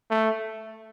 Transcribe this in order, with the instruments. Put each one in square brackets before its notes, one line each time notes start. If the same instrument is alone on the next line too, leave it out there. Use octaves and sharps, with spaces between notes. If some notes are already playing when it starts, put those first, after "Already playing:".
[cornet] A3